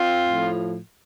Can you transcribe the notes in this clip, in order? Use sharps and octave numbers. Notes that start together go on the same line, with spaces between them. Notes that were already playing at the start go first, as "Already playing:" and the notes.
Already playing: C4 F4
A2 F3